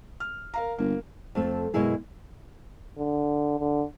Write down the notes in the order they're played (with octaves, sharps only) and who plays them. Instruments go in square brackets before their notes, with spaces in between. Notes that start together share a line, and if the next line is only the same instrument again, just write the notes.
[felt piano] F6
A#4 F5 A#5
[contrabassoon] G1 [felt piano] A#3
[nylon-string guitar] F2 A3 C4
F#2 B2 G#3 E4 G#4
[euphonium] D3
D3